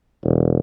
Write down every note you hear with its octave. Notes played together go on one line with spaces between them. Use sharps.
E1